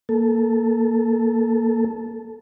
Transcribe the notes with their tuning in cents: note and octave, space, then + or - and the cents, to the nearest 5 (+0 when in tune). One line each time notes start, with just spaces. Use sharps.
A#3 +0 A4 -10